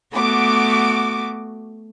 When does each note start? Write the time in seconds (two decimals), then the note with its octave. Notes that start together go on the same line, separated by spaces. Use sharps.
0.14 A3 B3 F#4 D6